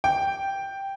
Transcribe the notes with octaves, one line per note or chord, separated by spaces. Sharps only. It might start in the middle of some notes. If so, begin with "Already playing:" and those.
G5